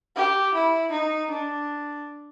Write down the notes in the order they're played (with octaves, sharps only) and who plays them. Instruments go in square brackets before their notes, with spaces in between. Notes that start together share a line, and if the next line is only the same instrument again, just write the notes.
[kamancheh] G4
E4
D#4
D4